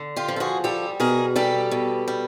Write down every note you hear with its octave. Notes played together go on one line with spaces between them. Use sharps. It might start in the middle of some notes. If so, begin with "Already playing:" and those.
Already playing: D3
F4 G4
F3
A4
F#4 G#4
G3 G4 A4
B2 G#4 A#4
G3 G4 A4
B2
G3